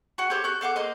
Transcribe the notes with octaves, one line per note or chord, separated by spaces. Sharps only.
F#4 F#5
G4 A4 C5 C#5
F#4 C#6 G6
A4 F5 F#5 D6
A#3 C5 D#5